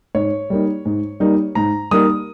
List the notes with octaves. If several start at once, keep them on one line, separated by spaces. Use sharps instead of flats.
G#2 C#5
G3 A#3 D#4
G#2
G3 A#3 D#4
G#2 A#5
G3 A#3 D#4 D#6